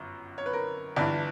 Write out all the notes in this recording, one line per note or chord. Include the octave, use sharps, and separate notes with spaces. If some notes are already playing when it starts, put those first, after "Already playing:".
Already playing: G1 F#2
C#5
B4
A#4
G1 G2 E3 D5